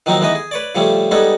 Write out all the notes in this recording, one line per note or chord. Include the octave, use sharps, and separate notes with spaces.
D#3 F3 F#3 A#3 C4 D#4
E3 G#3 B3 D#4 D#5
G#4
B4 C#5 D5
C#3 F3 G3 A3 C#4
G3 G#3 B3 C#4 D#4 A4